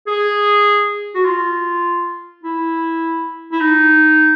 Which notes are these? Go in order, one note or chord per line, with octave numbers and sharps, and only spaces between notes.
G#4
F#4
F4
E4
E4
D#4